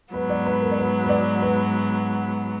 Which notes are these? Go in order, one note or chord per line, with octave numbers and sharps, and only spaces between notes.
G#2 F#3 B3 B4
D5
B4
A#4
D5
B4
B4
D5
B4